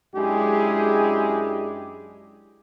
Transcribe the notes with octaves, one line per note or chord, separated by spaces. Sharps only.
F#2 G#3 D4 E4 G4 G#4